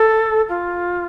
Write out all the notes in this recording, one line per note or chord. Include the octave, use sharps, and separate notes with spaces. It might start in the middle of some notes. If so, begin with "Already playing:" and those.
Already playing: A4
F4